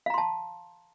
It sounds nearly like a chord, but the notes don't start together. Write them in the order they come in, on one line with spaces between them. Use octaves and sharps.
F5 A#5 C6 A5